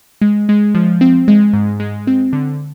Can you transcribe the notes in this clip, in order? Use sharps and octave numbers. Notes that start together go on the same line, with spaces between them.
G#3
G#3
F3
C4
G#3
G#2
G#3
C4
D3